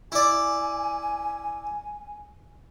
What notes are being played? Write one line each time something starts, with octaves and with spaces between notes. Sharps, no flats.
E4 D5 G#5